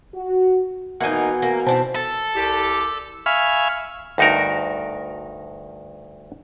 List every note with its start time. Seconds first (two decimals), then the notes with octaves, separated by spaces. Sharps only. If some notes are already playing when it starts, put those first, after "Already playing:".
0.14 F#4
1.00 B2 E3 A#3 D#4 F#5 G#5
1.42 A#3
1.66 B2 C4 D4 E4 C5 A5
1.95 A4
2.36 C2 G4
3.26 E5 F5 G#5 B5 C#6 F6
4.18 D2 G2 D#4 F#4 A#4